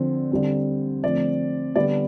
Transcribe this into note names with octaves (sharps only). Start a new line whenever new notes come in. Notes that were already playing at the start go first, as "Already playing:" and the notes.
Already playing: D3 F3 C4
D3 G3 C4
D3 F3 A3 C4 D5
D3 G3 B3 D5